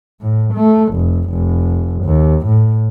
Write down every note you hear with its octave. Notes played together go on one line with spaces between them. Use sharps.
A2
A3
F1
F1
D#2
A2